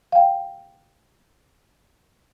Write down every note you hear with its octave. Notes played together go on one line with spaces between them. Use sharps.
F5 G5